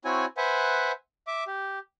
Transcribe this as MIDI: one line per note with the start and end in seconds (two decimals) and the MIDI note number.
0.05 0.26 60
0.05 0.26 64
0.05 0.26 66
0.05 0.26 73
0.05 0.26 80
0.37 0.92 71
0.37 0.92 72
0.37 0.92 76
0.37 0.92 78
0.37 0.92 80
1.27 1.44 76
1.27 1.44 86
1.47 1.79 67